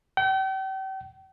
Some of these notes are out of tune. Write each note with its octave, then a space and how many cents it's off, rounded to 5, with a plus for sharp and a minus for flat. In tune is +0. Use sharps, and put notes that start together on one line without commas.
G5 -40